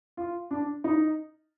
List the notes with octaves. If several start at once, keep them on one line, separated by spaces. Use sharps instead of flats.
F4
D4
D#4